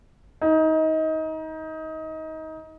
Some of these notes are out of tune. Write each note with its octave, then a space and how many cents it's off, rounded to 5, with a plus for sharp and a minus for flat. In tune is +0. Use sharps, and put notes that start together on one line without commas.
D#4 +25